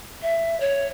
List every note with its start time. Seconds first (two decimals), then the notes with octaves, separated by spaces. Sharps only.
0.22 E5
0.60 C#5